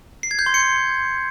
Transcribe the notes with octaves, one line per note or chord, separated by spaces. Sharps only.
C7
G#6
G6
C6
C#7